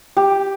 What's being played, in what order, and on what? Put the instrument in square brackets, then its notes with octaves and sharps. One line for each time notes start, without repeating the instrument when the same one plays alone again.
[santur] G4